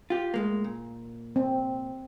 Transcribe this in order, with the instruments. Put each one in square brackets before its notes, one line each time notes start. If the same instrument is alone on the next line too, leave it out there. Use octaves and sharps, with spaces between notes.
[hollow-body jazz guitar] F4 G4
A2 G#3 A#3
A#2
[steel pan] C4